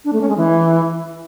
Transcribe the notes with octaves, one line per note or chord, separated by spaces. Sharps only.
D4
A3
C#4
G#3
E3